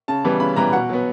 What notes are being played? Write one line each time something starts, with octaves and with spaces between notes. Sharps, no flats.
C#3 A5
E3 G3 B3
C#3 B5
E3 G3 B3 A#5
B2 F#5
F#3 B3